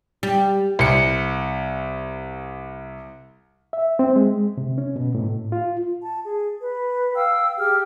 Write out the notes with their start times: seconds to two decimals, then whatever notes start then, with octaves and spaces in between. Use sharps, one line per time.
0.23 G3
0.79 C2 C#7
3.73 E5
3.99 C4
4.16 G#3
4.58 C3
4.78 C#4
4.96 B2
5.15 A2
5.52 F4
6.03 A5
6.25 G#4
6.61 B4
7.16 F5 G5 E6
7.58 G4 G#4 G5 F6